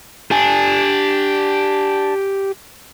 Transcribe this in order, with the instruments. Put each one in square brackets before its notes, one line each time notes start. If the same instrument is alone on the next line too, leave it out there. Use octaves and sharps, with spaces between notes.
[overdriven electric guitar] D4 [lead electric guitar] G4 G#5